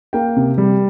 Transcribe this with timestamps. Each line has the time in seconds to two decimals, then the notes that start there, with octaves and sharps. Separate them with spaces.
0.13 A#3 G5
0.36 C3
0.58 G3